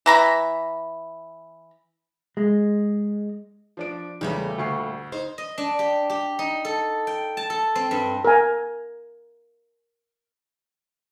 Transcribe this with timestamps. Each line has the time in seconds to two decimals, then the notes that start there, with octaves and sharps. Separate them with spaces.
0.06 E3 A#5 B5
2.37 G#3
3.77 F3 D4 D7
4.21 E2 A#2 C#3 G3 A3
4.58 D2 C#6 C7
5.12 D#4 C5
5.38 D#5
5.58 D4
5.79 G4
6.10 G4
6.39 D#4
6.65 A4
7.07 G5
7.37 A5
7.50 A4
7.75 C4
7.91 G2
8.25 A#4 G#5